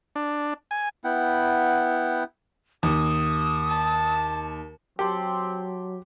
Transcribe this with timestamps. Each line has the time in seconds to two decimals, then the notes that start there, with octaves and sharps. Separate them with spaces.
0.16 D4
0.71 G#5
1.04 B3 E4 F#5 G5
2.83 D#2 D#6
3.69 A5
4.99 F#3 C4 G4 G5 A5 C6